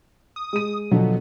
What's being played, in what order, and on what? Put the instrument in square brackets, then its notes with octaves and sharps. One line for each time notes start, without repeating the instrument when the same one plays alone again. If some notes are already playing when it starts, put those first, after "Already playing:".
[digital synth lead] D#6
[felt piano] G#3 D#7 [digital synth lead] D#6
[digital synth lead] B2 [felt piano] D3 F3 F#3